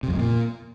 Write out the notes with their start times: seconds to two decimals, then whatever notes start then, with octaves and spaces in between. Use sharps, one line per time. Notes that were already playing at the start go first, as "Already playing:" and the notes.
0.03 C3
0.08 F2
0.14 A2
0.19 A#2